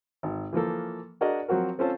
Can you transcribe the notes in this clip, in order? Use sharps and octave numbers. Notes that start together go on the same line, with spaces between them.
G#1
E3 F3 A#3 A4
D4 F#4 G#4 A#4 D5 D#5
F3 F#3 C4 F#4 A#4
C4 C#4 F4 A4 C5 A5